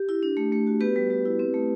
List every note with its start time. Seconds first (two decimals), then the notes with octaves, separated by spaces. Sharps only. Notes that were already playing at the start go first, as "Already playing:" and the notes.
Already playing: G4
0.09 E4
0.23 D4
0.37 A3
0.52 A3
0.67 F#4
0.81 B3 G4 B4
0.96 G3
1.10 G3
1.25 E4
1.39 C4
1.54 A3